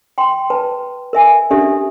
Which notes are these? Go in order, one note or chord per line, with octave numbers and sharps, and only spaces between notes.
G5 C6
B4 A5
A#4 E5 G#5
C#4 D4 G4 A4 E5